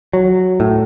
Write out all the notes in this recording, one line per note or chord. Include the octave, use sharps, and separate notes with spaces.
F#3
A2